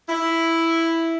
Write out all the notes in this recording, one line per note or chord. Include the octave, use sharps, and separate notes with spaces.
E4